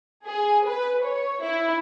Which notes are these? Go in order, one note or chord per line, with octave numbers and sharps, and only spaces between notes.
G#4
B4
C#5
E4